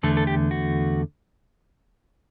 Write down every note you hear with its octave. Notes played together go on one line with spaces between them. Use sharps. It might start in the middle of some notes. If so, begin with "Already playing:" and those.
E2 D3 A3 A4
A4
G4
F#4